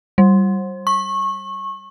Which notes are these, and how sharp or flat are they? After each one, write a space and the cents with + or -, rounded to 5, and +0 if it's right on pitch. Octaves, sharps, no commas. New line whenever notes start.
G3 -20
C#6 -25